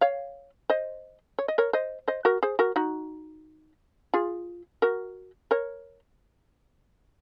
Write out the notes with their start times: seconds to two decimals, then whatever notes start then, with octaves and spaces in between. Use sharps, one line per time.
0.01 C#5 F5
0.70 C5 D#5
1.39 C#5
1.48 D#5
1.58 A#4 C#5
1.73 C5 D#5
2.08 C5 D#5
2.25 F#4 A#4
2.43 G#4 C5
2.59 F#4 A#4
2.76 D#4 F#4
4.14 F4 G#4
4.82 F#4 A#4
5.51 A#4 C#5